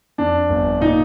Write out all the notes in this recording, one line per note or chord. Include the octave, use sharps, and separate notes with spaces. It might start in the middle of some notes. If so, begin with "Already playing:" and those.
F2 D4
G1
A#2 D#4